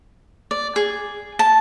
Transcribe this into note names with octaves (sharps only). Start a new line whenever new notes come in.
D5
G#4
A5